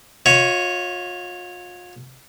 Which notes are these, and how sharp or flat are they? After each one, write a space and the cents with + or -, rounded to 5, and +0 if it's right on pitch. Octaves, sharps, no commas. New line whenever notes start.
F4 +40 C#5 +0 E5 -40